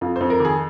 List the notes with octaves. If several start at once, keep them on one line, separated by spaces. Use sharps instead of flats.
F2 F4
F2 C5
A#4
D#3 G#4